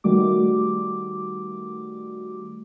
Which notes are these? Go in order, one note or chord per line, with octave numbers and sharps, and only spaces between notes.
D#3 G3 A3 F#4 D6